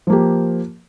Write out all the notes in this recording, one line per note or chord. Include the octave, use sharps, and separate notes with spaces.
F3 A#3 G4